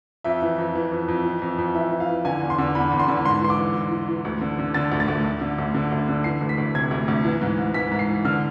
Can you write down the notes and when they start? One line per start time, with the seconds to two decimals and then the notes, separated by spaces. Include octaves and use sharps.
0.24 F2 E5
0.42 E3
0.58 F2
0.75 E3
0.92 F2
1.08 F2
1.25 E3
1.42 F2
1.58 F2
1.75 E3 E5
1.91 E3
2.00 F5
2.09 E3
2.25 D3 G#5
2.41 E2
2.50 C6
2.58 D3
2.75 E2 B5
2.92 E2
3.00 C6
3.08 D3
3.25 G#2 C6
3.42 E3 C6
3.50 D6
3.58 E3
3.75 E3
3.91 E3
4.09 E3
4.25 D2
4.41 D3
4.59 D3
4.74 D3 A6
4.92 D2
5.00 A6
5.08 D2
5.24 D2
5.41 D3
5.58 D2
5.74 D3
5.92 D2
6.08 D3
6.24 E3 C7
6.41 D2
6.49 B6
6.58 D2
6.75 C3 G#6
6.91 D2
7.08 D2
7.24 E3
7.41 G#2
7.58 G#2
7.74 E3 B6
7.91 G#2
7.99 C7
8.08 E3
8.25 D3 F6